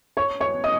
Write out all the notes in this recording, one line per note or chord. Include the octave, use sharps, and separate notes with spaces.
C#5 C#6
C#5 C#6
D#5 D#6